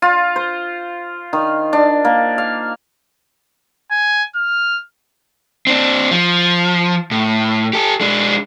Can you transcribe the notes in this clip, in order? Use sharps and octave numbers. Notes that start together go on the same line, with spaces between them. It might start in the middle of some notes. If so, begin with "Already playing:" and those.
F4
C5
D#3
D4
A#3
F5
G#5
F6
C4 D4
F3
A2
G4 A4
G#3 D4